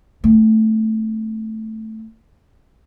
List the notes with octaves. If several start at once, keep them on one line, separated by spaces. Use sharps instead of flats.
A3 C4